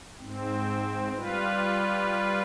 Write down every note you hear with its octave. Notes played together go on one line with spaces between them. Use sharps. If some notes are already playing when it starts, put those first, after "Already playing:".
G#2 C4
G3 F4 B4